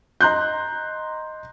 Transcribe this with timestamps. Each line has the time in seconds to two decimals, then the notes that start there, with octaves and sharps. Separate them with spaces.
0.21 D#5 A#5 C6 F#6 G6